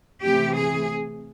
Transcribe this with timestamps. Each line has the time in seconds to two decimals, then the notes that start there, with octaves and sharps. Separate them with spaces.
0.23 C3 E3 A3 C4 G4
0.55 G#4